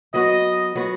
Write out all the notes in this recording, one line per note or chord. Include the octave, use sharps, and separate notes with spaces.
F#3 B3 F#4 D#5
F#3 B3 F#4